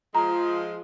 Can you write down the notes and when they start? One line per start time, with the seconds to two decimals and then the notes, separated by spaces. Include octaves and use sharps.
0.15 F3 G#3 A#5